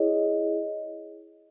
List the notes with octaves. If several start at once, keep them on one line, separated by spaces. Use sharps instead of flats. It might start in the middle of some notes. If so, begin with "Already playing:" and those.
Already playing: E4 G#4 C#5 D#5